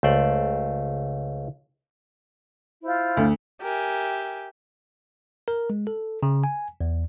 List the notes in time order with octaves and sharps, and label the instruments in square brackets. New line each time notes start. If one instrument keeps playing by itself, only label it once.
[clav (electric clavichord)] C#2 A3 C5 D5
[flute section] E4 F4 C5
[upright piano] D2
[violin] G4 [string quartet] A#4 E5 G#5
[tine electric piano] A#4
G#3
A4
C#3
G#5
E2